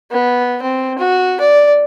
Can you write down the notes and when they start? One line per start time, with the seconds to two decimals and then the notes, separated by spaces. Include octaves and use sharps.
0.11 B3
0.62 C4
0.98 F#4
1.40 D5